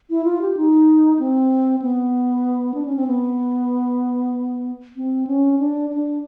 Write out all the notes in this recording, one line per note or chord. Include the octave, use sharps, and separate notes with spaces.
E4
F4
G4
D#4
C4
B3
D4
C#4
C4
B3
C4
C#4
D4
D4